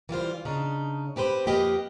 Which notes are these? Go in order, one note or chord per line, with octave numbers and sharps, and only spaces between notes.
E3 G3 F4 C5
C#3 D4 D#4
C4 G4 B4 C5
F2 F3 A#3 G4 B4 D#5